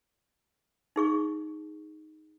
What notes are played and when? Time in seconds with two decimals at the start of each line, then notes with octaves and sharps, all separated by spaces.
0.96 D#4 G#4 C#6